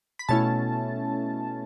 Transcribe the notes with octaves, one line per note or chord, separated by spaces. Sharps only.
B5
B2 A3 C#4 E4 A5